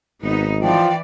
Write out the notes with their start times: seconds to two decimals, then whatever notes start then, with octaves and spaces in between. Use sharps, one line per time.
0.23 G#1 B3 D#4
0.61 E3 F3 D5 G5